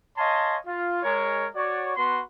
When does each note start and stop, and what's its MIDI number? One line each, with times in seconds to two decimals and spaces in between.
0.18 0.57 73
0.18 0.57 75
0.18 0.57 77
0.18 0.57 80
0.18 0.57 81
0.18 0.57 84
0.67 1.02 65
1.03 1.46 56
1.03 1.46 70
1.03 1.46 73
1.56 1.94 66
1.56 1.94 73
1.56 1.94 74
1.96 2.21 59
1.96 2.21 66
1.96 2.21 71
1.96 2.21 84